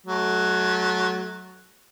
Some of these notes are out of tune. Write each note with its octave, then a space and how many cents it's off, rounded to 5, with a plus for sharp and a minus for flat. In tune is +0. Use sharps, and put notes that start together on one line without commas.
F#3 +0 A3 -30